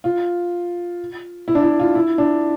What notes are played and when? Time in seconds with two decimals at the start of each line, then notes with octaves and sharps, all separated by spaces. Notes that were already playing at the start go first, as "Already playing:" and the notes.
0.04 F4
1.48 E4
1.55 D4
1.63 E4
1.80 F4
1.95 E4
2.18 D4